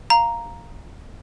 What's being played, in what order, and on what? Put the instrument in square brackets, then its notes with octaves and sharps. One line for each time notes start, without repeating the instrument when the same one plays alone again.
[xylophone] F5 A#5